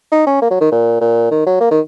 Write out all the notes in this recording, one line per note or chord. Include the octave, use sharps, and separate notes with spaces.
D#4
C#4
A#3
F#3
D#3
A#2
A#2
D#3
F#3
A#3
D#3